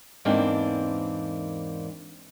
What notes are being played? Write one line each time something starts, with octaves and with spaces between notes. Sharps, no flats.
E2 G#2 E3 A#3 C4 D4